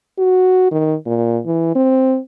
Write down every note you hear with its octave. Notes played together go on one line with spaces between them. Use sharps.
F#4
D#3
A#2
E3
C4